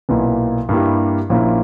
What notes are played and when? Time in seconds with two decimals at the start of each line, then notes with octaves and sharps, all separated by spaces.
0.09 B1 A#2 A#3 E4
0.69 G2 G3 A#3 E4 G4
1.30 A#1 A#2 A#3 C#4 E4